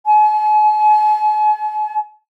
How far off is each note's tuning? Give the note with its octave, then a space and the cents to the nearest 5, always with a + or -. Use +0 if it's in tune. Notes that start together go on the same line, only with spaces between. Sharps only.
G#5 +45